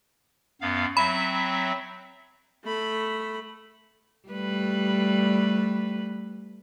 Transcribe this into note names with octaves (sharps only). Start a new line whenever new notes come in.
F#2 B3 F5
F#3 C4 E5 B5
A3 B5
G3 A3 B4